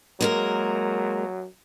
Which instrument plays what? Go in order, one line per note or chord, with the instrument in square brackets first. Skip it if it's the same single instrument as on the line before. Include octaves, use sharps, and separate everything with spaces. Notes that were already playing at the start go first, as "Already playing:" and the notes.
[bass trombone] F#3 [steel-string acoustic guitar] G#3 A#3 A#4